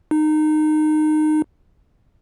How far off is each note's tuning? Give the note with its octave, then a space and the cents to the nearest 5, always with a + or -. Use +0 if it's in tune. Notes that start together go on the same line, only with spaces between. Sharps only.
D#4 -20